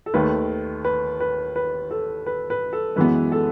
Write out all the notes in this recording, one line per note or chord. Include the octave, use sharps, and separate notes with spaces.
A4
D#2 D#3 A3 B4
B4
B4
B4
A4
B4
B4
A4
F#2 E3 G#3 B3 B4
A4